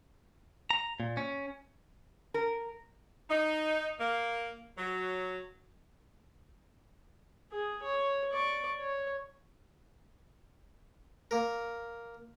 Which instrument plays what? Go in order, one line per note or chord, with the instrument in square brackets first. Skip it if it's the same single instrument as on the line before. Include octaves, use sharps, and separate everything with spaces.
[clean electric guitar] A#5
A#2
C#4
[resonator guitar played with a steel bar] A#4
[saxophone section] D#4
A#3
F#3
[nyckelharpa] G#4
C#5
D5 C#6
C#5
[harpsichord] A#3 A#4